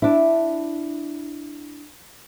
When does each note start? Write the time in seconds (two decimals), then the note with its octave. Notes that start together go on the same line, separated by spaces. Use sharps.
0.02 D4 E4